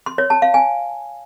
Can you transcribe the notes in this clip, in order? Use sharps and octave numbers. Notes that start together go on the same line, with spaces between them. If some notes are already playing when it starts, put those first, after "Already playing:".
C6
C#5
A5
F5
G#5